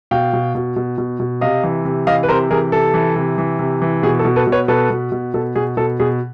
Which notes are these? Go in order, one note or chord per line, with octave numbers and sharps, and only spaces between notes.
B2 F5 G5
B2
B2
B2
B2
B2
C3 D#5 F5
E3
C3
E3 D#5 F5
B4
C3 A#4 C5
E3 G#4 A#4
C3 A4
E3
C3
E3
C3
E3
B2 G#4
A4
B2
A4 B4
B2
B4 C#5
B2 A4 B4
B2
B2
B2 A4
B2 G#4
B2 A4
B2 G#4